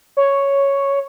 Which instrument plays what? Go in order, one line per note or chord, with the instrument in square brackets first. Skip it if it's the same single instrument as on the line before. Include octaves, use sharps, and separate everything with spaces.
[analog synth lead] C#5